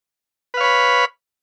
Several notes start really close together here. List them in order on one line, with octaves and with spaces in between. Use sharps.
B4 F5 C#5 B5